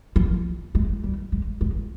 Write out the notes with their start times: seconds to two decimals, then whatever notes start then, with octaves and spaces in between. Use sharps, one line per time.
0.16 F3
0.75 G#3
1.04 G3
1.32 G#3
1.61 G#3